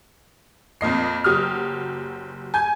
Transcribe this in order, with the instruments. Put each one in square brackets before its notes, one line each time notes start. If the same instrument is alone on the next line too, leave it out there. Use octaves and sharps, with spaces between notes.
[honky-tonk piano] F2 A#2 D#5 C7
F#1 F#3 G4 D#6 F6
G#5 G6 G#6